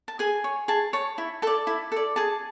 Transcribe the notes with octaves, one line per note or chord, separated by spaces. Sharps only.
A5
G#4 G#5
C#5
G#4 A5
C#5 A5
E4
A4 D5 A5
E4
A4 D5
G#4 A5